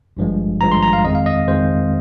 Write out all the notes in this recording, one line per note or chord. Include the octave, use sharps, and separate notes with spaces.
G#1 G2 F3 G#3
G#1 G2 F3 G#3 A#5
C6
A#5
F5
F2 D#3 G#3 C4 D#5
F5
D#5
F2 D#3 G#3 C4 C5